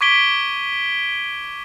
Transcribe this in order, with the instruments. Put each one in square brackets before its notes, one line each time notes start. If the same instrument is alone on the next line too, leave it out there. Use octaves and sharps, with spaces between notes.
[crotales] C#6 D6 G#6 B6 D7 G7